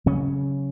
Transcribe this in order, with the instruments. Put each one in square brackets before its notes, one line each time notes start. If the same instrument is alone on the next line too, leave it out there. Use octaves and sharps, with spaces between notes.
[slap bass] C#3 F#3 C#4